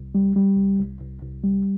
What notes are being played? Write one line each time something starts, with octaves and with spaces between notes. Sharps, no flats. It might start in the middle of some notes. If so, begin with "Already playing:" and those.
Already playing: C2
G3
G3
C2
C2
C2
C2
G3